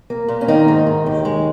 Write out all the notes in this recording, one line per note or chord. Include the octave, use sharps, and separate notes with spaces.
A#3
A#2
C#4
D#3 A#3 D#4
G#2
G#2
D#2
G#3